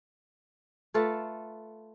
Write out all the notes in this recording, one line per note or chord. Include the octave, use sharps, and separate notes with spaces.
A3 F4 A4 B4